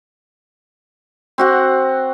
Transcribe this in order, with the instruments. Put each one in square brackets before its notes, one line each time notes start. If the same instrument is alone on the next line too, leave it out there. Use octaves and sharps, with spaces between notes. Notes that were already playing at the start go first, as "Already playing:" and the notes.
[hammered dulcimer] C4 F#4 F#5